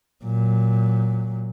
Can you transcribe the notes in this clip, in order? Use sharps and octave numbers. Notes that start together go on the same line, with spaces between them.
A#2 F#3